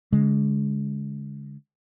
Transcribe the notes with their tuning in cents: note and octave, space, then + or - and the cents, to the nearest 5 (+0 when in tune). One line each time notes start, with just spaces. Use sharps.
D3 -45 G#3 +0